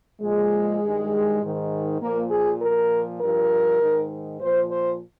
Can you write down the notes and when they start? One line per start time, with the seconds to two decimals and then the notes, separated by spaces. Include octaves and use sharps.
0.21 A#2 F3 G#3
0.81 G2 D#3
1.41 G#2 D#3
2.01 A#2 F3 A#3
2.31 G#4
2.61 A#2 F3 A#4
3.21 G2 F3 A#4
3.81 G#2 D#3
4.40 A#2 F3 C5
4.70 C5